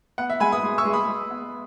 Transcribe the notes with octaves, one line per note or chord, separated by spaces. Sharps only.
B3 F#5
E5
G#3 G#5 B5
B5 D#6
G#3
C#6 E6
G#3
B5 D#6
G#3
B3